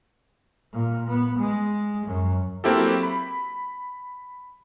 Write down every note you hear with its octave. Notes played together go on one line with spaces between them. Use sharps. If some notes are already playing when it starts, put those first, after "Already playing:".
A#2
B3
G#3
F#2
F#3 A#3 C4 E4 G4 A4
B5